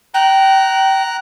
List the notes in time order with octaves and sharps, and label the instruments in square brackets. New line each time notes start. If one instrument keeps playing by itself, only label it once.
[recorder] G5 [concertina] A#5 F#6